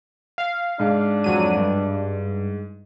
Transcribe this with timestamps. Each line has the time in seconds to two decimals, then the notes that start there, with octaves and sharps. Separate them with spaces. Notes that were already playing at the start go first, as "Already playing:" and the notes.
0.38 F5
0.79 G#2 D4
1.24 F2 F#3 D#7
1.57 G2